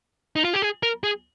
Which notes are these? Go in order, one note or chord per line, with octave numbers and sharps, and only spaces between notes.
D#4
F4
G4
G#4
A#4
G#4